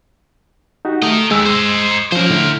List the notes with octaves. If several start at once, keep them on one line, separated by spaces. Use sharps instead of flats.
D#4 F#4 G4
A3 A#4 D#5
D#2 G#3 E6
C5 D#5
F3 C#4 A#4 C5
A2 D3 E4